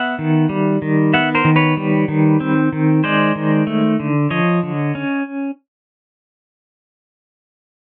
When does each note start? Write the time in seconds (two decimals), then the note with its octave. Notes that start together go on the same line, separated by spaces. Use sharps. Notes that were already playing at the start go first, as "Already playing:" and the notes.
Already playing: B3 E5 F#5
0.19 D#3
0.49 G3
0.82 D#3
1.14 B3 E5 F#5
1.35 A#4 C5
1.45 D#3
1.56 B4 C#5
1.77 G3
2.08 D#3
2.40 C4
2.73 D#3
3.04 G#3 C5 D5
3.36 D#3
3.67 A3
4.00 D3
4.30 F3 C#5 D#5
4.63 D3
4.95 C#4